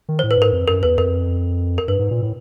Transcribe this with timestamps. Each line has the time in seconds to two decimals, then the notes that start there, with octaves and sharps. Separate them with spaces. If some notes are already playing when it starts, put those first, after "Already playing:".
0.09 D#3
0.19 A2 C5
0.31 B4
0.38 G#2 A#4
0.53 F2
0.68 F#2 A#4
0.83 E2 B4
0.98 F2 A#4
1.78 A#4
1.88 G2 B4
1.99 G#2
2.11 A#2
2.22 A2